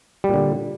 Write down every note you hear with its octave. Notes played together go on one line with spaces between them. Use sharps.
A#2 D3 G3